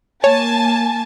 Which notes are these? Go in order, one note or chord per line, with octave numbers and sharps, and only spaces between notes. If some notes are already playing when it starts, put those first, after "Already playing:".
A#3 C#5 G#5 A5